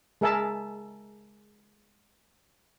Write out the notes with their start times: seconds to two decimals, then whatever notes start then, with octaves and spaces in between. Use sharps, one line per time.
0.21 G#3 G#4 A#4 E5 A5